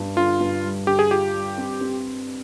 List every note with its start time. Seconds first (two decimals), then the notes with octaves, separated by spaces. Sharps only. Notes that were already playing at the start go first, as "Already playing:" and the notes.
Already playing: G2
0.16 D3 F4
0.41 G2
0.64 G3
0.87 D3 G4
0.99 G#4
1.11 F4 G4
1.34 G3
1.58 C4
1.81 C4